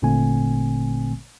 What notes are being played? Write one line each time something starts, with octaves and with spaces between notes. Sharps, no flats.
G#1 A#2 D3 A3 C4 G#5